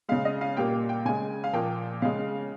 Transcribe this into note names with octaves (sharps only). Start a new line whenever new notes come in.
C#3 G#3 F5
D#5
F5
A#2 G3 A#3 G5
G5
C#3 G#3 G#5
F5
A#2 F3 A#3 G5
C#3 G#3 F5